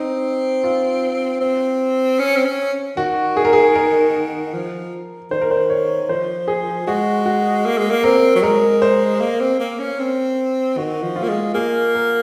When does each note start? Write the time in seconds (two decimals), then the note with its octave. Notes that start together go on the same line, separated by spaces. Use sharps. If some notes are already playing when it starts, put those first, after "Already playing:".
Already playing: C4 D#4
0.64 F4
1.41 C4
2.19 C#4
2.37 C4
2.45 C#4
2.97 D#3 F#4
3.37 G#4
3.45 A#4
3.53 G#4
3.75 A#4
4.54 F3
5.31 D#3 C5
5.41 A#4
5.51 C5
5.70 C#5
6.09 F3 C5
6.48 G#4
6.86 G#3 F#4
7.26 F#4
7.65 A#3
7.78 G#3
7.91 A#3
8.03 C4 A#4
8.35 F#3
8.43 G#3 A#4
8.82 C5
9.21 A#3
9.40 C4
9.60 A#3
9.79 C#4
9.99 C4
10.77 D#3 F#4
11.03 F3
11.16 F4
11.23 A#3
11.29 G#3
11.54 A#3 G#4
11.94 A#4